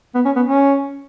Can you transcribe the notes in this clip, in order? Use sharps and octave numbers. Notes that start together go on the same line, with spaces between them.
B3
C#4
B3
C#4